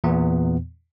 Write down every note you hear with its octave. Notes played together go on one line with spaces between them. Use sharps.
E2 A#2 E3 B3